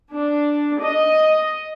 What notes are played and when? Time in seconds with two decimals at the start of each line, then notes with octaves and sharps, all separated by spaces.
0.15 D4
0.84 D#5